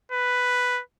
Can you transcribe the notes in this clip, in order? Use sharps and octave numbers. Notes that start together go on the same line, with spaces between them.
B4